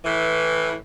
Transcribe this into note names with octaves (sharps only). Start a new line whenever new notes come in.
A2 E3